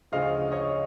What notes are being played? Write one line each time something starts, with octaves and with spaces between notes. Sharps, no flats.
D2 C#3 F3 D#5 F5
C#5 D#5